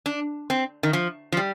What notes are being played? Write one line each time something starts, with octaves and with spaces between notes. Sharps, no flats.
D4
C4
D#3
F3
F3
G3